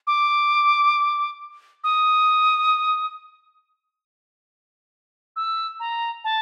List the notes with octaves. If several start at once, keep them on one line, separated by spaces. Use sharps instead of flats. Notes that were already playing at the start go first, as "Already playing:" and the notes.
D6
D#6
E6
A#5
A5